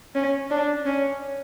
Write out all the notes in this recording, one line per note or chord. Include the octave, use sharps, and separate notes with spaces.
C#4
D4
C#4